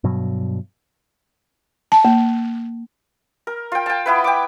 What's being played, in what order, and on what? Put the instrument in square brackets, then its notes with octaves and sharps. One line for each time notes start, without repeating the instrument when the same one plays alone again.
[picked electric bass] G2 B2 F#3
[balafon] A5
A#3
[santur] A#4
F4 G5
G5 A5
B3 E4 B4
G5 D6